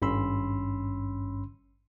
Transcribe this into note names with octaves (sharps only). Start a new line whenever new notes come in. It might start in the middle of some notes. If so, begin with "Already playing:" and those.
G#1 G2 C#4 B5 C6 E6